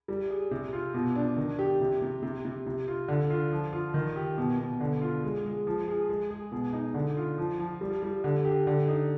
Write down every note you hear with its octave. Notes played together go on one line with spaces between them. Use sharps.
G3
G#4
C3
F4
B2
D4
D#3
G4
C3
C3
C3
C3
C3
F4
D3
F4
F3
F4
D#3
G4
B2
B2
D3
F4
G#3
G#3
F3
G#4
G#3
G#4
B2
D#4
D3
F4
F3
F3
G3
G3
D3
G4
D3
D#4